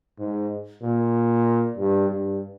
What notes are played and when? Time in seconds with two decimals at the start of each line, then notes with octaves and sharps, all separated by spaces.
0.19 G#2
0.83 A#2
1.77 G2
2.09 G2